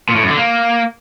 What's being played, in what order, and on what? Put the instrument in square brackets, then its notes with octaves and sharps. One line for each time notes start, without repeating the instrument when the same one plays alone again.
[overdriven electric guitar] A#2
A2
F#2
D3
A#3